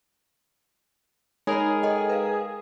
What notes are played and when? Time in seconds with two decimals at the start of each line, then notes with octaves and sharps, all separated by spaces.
1.47 G#3 D#4 G#4 A#4 C#5 B5
1.83 A4 D#5 G5
2.10 B4 F5